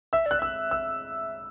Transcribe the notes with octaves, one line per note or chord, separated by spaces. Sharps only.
E5 E6
D5 F#6
E5 E6
E6